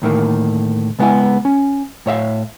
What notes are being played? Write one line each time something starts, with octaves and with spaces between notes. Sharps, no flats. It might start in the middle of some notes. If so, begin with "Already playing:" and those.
D2 A2 D#3 A#3
C#2 G#3 B3 C#4 E4 G#5
C#4
A2 C#5 E5 F5